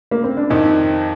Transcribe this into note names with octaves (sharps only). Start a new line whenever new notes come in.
A#3
C4
D4
F2 C3 D#3 D#4